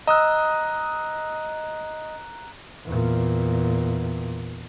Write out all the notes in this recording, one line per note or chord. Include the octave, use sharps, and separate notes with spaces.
D#5 A#5 D#6 E6 F#6
E2 A#2